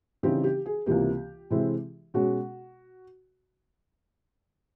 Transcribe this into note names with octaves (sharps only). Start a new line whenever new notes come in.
C#3 E3 G3 C4 D#4 G4
G4
G#4
C#2 C3 E3 G3 A#3 G4
C3 E3 G#3 C4 E4
B2 G#3 C#4 F#4